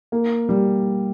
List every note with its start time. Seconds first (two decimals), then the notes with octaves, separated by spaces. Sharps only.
0.12 A#3
0.49 G3